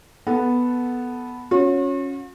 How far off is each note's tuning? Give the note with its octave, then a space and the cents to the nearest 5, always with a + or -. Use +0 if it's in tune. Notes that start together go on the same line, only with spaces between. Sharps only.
B3 +0 A4 -5 F#5 +0
C#4 -5 F#4 -45